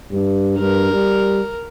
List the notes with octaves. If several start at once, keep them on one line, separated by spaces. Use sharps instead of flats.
G2
G2 A#4
G3